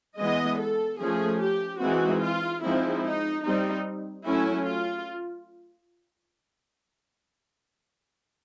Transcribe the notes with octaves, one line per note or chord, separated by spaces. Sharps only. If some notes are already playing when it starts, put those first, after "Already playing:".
E3 G#3 B3 D#5
A4
F3 A3 C#4 G#4
G4
E3 G#3 C4 D#4 F#4
F4
F3 G#3 C4 D#4 E4
D#4
G3 C4 D#4
F#3 A3 C#4 E4
F4